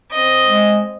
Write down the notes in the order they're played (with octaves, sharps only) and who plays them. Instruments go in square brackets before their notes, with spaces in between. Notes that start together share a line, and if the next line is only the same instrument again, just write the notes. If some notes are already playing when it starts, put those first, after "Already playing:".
[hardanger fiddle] C4 D#5
[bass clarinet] G#3